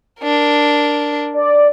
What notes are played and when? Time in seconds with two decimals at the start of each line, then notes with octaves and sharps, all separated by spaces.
0.21 D4 A#4
1.34 D5